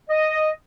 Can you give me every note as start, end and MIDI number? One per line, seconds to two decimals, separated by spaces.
0.08 0.50 75